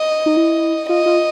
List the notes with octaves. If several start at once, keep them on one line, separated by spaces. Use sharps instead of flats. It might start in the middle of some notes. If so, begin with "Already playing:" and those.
Already playing: D#5
D#4
E4
F4 D#5
F4